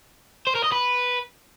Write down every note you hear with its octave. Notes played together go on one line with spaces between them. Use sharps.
C5
A#4
D#5
B4